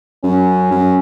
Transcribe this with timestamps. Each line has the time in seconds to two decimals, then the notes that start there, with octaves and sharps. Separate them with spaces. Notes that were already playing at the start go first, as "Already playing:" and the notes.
0.24 F#2 C#4
0.71 F#2